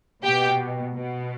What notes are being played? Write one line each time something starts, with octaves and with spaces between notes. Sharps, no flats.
B2 G4 G5
B2